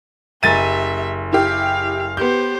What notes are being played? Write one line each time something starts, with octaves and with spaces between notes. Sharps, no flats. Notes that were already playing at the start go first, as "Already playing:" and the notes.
F#1 G4 E5 A6 D#7
E4 G4 F5
B3 G4 C5 G6